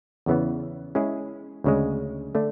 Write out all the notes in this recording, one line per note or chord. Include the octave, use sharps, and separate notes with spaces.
E2 C#3 E3 B3
G#3 C#4 E4 G#4
D2 C#3 G#3
D3 A3 D4